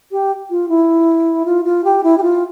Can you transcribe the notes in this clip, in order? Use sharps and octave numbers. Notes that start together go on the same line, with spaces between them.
G4
F4
E4
F4
F4
G4
E4
G4
F4